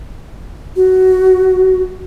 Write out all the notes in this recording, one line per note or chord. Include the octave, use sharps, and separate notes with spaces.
F#4